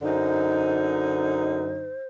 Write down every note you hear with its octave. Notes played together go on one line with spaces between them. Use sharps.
F#2 D3 D#4 C5